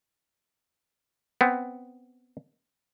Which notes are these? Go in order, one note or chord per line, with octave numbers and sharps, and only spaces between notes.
B3 C4